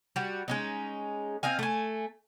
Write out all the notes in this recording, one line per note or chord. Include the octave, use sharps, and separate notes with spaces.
G3 F#4
G#3 C#4 D#4
C4 D#5 F5 G#5
A3 G#5